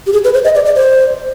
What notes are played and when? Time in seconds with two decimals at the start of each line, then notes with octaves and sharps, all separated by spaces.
0.07 G4
0.13 G#4
0.24 B4
0.34 C5
0.44 D#5
0.55 D5
0.65 D5
0.76 C5